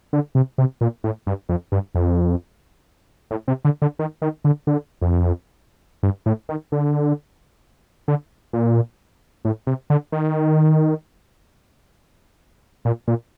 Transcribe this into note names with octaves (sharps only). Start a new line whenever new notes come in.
D3
C3
C3
A#2
A2
G2
F2
G2
F2
A2
C3
D3
D3
D#3
D#3
D3
D3
F2
G2
A2
D#3
D3
D3
A#2
A2
C3
D3
D#3
A#2
A#2